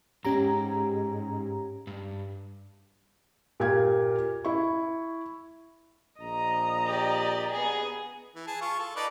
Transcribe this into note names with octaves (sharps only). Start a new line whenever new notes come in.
F2 G#2 C#4 G4 A#5
G2
A#2 G4 F5 G#6
E4 C#6
A#1 D#5 A#5
G4 D5
B3 G#4
E3
G#4 A5
F4 C#6
A4
D#4 B4 D5